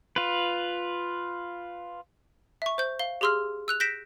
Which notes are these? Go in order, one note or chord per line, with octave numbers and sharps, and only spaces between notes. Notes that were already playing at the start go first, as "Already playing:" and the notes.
F4 B4
E5 C#6
C5 G6
F5 G7
G4 G#4 C6 E6 F6
E6 F#6 F7
G6 A#6 B6 D7 E7